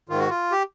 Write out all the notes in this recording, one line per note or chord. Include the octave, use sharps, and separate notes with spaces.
G#2 D#3 F4
F#4
F4
G4